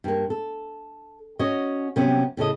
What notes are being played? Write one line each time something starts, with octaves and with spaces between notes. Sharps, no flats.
G2 A#3
A4
C#4 F#4 C#5 D#5
C3 F#3 G3 B3 C#4
A2 C#3 A4 D#5